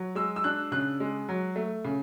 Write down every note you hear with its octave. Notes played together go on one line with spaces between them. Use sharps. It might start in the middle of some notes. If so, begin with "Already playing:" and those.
Already playing: F#3
G#3 E6
E6
D4 F#6
C#3 F#6
G#3
F#3
A3
C#3